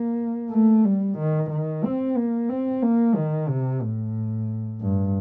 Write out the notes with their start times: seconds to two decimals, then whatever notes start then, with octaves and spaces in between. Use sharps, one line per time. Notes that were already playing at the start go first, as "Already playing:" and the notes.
Already playing: A#3
0.51 A3
0.84 G3
1.18 D#3
1.50 D#3
1.84 C4
2.17 A#3
2.49 C4
2.82 A#3
3.15 D#3
3.48 C3
3.82 A2
4.81 G2